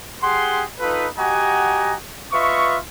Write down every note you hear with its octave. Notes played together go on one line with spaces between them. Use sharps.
G4 G#4 F#5 C6
D#4 F4 A4 B4
F#4 G4 D#5 F#5 G#5 A#5
F4 B4 D#5 E5 C#6